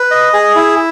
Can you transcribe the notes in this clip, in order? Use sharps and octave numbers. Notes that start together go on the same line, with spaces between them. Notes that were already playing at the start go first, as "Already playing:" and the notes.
Already playing: B4
D#5
G#4
E4